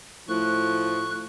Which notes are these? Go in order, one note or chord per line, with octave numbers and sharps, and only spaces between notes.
A2 F3 C#6 F#6